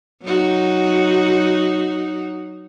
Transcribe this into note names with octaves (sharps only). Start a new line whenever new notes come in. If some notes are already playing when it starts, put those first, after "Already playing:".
F#3 D#4 F#4